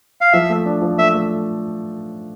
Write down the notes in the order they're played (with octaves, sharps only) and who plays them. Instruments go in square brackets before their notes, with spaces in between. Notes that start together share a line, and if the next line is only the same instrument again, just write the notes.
[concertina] F5
[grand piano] F3 [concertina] E5
[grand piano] A3
D4
F3
[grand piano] A3 [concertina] E5
[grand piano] A3